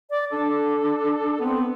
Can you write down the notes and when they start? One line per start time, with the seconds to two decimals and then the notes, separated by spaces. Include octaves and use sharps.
0.10 D5
0.32 D4 A4
1.40 B3 C4